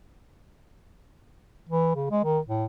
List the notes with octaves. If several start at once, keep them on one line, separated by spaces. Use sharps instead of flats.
E3
C#3
G#3
D#3
A2